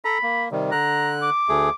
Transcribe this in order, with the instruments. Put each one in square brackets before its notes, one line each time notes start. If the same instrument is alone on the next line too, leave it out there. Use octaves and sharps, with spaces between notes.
[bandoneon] A4 A#5 [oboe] B5
[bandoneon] A#3
C3 D#3 G3
[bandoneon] D3 F#6 [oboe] A#5
[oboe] D6
[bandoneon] D2 A3 G#4